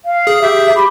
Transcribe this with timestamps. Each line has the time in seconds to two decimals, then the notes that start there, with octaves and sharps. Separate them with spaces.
0.05 F5
0.27 G#4
0.42 G4 E5
0.75 G4 B5